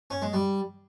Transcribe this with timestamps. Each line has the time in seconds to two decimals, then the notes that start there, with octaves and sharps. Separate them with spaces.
0.11 C#4
0.22 G#3
0.33 G3